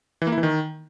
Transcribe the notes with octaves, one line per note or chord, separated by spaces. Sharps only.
E3
A#3
E4
E3
D#3